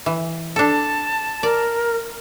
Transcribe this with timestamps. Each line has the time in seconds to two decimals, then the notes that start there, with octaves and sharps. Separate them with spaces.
0.06 E3
0.56 D4 A4 A5
1.43 A#4 D5